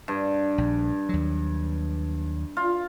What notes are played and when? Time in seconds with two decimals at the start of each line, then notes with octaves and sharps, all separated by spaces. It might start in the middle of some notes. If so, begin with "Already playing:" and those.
0.08 G2
0.58 A#1
1.09 D#2 F#3
2.57 F4